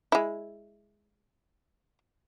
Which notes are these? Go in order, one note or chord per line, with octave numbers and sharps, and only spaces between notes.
G#3 E4